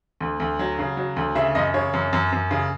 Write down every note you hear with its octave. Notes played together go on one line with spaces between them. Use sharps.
D2
D2
F#3
C#3
F#3
D2
C#3 E5
F#2 D#5
C#3 C#5
F#2
F#2
F#2
C#3